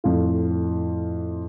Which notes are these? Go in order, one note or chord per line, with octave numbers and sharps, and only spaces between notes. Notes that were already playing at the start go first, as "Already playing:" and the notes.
F2 A2 F4